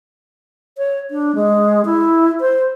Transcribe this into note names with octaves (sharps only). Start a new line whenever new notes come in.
C#5
D4
G#3
E4
C5